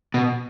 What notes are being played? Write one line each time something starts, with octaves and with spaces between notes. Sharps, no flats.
B2